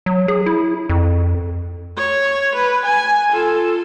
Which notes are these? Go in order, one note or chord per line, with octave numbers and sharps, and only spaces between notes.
F#3
G#4
E4
F2
C#5
B4
G#5
F4 A4